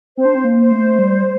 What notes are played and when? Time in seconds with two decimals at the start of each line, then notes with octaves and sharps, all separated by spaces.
0.17 C4 C5
0.25 D4
0.35 C4
0.44 A#3
0.58 C5
0.71 A3
0.99 G3